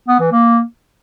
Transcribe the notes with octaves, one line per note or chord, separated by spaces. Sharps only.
B3
E3
A#3